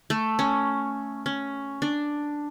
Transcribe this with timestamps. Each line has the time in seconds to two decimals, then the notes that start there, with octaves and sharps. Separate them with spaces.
0.10 A3
0.39 C#4
1.26 C#4
1.82 D4